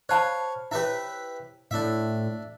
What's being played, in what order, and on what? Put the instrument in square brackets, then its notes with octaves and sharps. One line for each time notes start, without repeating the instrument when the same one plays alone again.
[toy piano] C5 A5 B5 [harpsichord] C#5 F5
[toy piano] E4 C#5 [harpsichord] G4 B4 E5
[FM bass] A2 [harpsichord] D4 E5